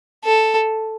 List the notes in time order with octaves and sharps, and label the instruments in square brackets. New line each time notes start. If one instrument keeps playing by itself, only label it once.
[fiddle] A4